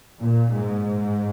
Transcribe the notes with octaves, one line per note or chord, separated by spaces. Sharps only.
A#2
G#2